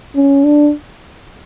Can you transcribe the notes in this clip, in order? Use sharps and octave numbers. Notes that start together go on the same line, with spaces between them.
C#4
D4